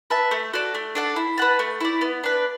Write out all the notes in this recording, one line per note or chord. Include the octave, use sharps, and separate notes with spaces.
B4 E5 A5
A3
F#4 A4 D5
A3
D4 A4 F#5
E4
B4 F#5 A5
A3
E4 D5
B3
D4 B4